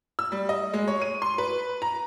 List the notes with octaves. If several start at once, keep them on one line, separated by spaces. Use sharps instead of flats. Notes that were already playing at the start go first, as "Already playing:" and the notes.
E6
G3
D#5
G#3
C#5
D#7
C6
B4
A#5